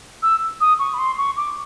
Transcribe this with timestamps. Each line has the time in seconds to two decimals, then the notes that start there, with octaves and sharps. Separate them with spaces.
0.23 E6
0.61 D#6
0.79 C#6
0.94 B5
0.99 C6
1.18 C#6
1.37 D6